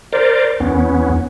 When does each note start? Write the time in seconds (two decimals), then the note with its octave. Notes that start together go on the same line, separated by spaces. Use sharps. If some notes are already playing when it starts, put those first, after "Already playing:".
0.13 A#4 C5 D5
0.60 E2 B3 C#4